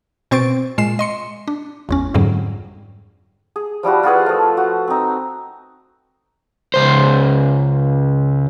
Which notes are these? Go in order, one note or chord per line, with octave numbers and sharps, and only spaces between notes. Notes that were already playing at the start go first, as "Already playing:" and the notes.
B2 C4 C5 C#6 A6 D7
A#2 G#3 C7 E7
D#5 C6 C#7
D4
G#1 E2 C#4
F2 G#2 D3 F#3 G3
G#4
F3 G3 E4 F#4
F4 F#4 G#4 B4
F3 A3
F#4
C4 D#4
C#2 C5